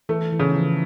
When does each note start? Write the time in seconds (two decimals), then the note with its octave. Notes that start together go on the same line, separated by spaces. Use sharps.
0.09 E3 A3
0.32 E3
0.39 C#3
0.49 E3
0.56 F3